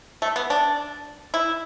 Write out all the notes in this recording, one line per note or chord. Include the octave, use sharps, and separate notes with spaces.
A3
B3
D4
E4